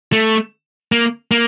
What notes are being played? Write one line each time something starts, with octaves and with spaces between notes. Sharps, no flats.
A3
A#3
A#3